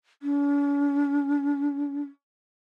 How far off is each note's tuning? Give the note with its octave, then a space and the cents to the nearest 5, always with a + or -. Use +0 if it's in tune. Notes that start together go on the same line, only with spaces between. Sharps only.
C#4 +45